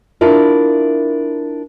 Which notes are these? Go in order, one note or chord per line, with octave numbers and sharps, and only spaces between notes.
D4 E4 F4 A#4